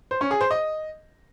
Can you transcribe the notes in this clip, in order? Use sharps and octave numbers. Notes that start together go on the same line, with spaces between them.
C5
C#4
G#4
C5
D#5